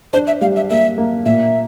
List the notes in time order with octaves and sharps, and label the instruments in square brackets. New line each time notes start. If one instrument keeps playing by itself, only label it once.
[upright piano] D4 [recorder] C5
[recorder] E5
[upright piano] G3 [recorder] F5
[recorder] E5
[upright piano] A#3 [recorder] E5
[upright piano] A#3
[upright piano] A#2 [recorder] E5